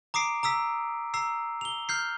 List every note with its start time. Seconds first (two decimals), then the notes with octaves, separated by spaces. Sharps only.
0.14 A#5 D6 D#6 C7 D7
0.43 A#5 D#6 E6 B6
1.14 A#5 E6 C7
1.61 F7 G7
1.89 F6 G6 C7